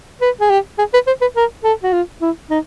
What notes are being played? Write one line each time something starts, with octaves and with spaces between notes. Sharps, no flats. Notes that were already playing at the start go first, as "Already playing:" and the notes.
B4
G#4
G4
G#4
B4
C5
B4
A#4
A4
F#4
F4
E4
D#4